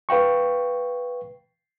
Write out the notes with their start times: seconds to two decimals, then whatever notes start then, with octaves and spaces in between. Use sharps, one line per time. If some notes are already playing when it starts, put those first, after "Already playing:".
0.09 B4 F5 G5 C#6